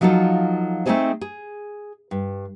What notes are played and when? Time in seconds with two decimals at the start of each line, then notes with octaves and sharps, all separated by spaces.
0.01 F3 F#3 D#4 F4 A4
0.86 A3 C4 D4 D#4 G#4 C5
1.21 G#4
2.11 G2